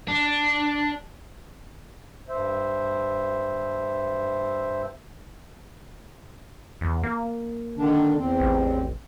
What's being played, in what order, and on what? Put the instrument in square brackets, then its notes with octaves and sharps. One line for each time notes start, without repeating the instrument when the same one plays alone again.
[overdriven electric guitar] D4
[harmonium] G2 C5 E5
[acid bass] E2
A#3
[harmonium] D3 D#3 D4
E2 C4
[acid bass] A1